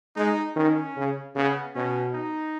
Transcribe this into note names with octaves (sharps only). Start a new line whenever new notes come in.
G#3 D#4
D#3 C#4
C#3
C#3 B3
B2 C#4
D#4